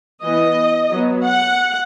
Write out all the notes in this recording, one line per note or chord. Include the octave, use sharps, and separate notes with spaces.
E3 B3 D#5
F#3 B3
F#5